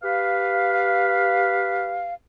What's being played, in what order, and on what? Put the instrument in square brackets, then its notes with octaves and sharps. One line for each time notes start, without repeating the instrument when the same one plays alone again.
[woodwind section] G4 B4 F5